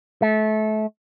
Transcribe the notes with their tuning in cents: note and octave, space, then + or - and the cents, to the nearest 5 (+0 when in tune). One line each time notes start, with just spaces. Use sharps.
A3 -30